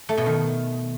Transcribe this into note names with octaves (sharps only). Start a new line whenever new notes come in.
A3
B2
D#3